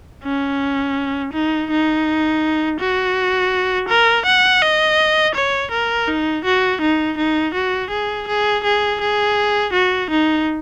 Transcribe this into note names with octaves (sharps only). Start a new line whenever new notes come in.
C#4
D#4
D#4
F#4
A#4
F#5
D#5
C#5
A#4
D#4
F#4
D#4
D#4
F#4
G#4
G#4
G#4
G#4
F#4
D#4